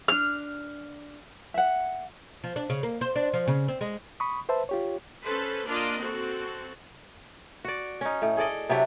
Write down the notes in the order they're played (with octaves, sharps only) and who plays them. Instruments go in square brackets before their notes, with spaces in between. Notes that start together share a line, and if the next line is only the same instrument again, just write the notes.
[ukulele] C#4 D4 [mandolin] F6
[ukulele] E5 F#5
[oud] F3
D4
C#3
A#3
C5
D4
F3
C#3
C4
G#3
[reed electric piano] B5 C#6 D#6
B4 C5 E5 A5
F4 G4 C#5
[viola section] C#4 A4 B4 C5
A#3 D4 F4 D5 D#5
C4 F#4 A4
[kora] F#4 D5
C#4 D#4
A2
G#4 A4 D5 D#5
C3 F#3 D4 E4